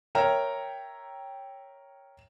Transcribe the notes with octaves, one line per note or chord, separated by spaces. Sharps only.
A#4 C#5 E5 G5 A#5